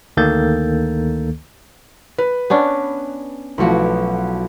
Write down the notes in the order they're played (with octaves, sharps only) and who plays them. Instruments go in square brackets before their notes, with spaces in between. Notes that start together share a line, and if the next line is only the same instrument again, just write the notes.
[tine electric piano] D2 D#3 A#3 A4 G6 A6
[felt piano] B4
[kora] B3 C#4 D4
[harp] B1 F#4 [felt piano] F3 A3 E4